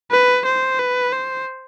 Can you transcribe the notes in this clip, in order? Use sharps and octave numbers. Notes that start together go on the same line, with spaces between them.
B4
C5
B4
C5